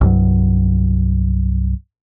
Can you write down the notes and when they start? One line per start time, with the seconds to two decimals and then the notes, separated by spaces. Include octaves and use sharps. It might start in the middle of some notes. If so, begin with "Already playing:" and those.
0.01 C2 G2 F#3